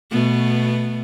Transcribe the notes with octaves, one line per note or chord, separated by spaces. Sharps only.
B2 A3 B3